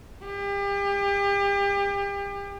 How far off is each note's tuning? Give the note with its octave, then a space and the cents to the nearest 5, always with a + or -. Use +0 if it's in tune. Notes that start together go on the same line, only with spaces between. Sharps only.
G4 +35